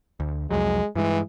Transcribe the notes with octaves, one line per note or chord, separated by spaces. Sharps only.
D2
C2 F2 F#3 G#3
G2 E3 G#3